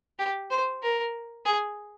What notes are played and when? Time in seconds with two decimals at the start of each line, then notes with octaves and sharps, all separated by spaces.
0.18 G4
0.51 C5
0.82 A#4
1.45 G#4